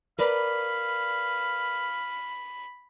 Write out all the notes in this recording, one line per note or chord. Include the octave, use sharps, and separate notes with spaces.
A#4 B4 D5 F5 B5